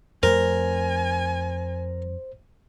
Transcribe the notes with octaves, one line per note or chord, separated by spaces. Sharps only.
F2 A3 A#4 C5 G#5